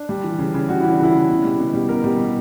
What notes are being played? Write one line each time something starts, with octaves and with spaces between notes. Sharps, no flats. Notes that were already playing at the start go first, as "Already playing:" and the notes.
Already playing: D4
G3
E3
C#3
C#3
G3 F#4
E3 E4
D4
C#3 E4
C#3
B2
G3
B2
G3
B2 A#4
G3
B2